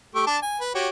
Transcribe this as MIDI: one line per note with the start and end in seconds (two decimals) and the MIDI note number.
0.15 0.26 57
0.15 0.26 67
0.15 0.26 85
0.26 0.37 62
0.26 0.37 74
0.26 0.37 81
0.42 0.58 80
0.60 0.74 71
0.75 0.89 66
0.75 0.89 67
0.75 0.89 73